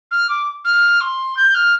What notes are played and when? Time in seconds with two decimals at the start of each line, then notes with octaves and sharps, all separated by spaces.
0.11 F6
0.29 D6
0.64 F6
1.00 C6
1.36 G6
1.54 F6